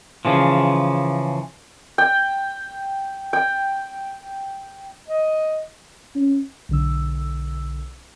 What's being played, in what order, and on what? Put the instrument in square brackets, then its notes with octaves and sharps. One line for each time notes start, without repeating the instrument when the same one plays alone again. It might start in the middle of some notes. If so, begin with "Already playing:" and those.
[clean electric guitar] C#3 E3 F3
[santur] G5
G5
[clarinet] D#5
[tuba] C#4
[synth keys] B1 D3 E6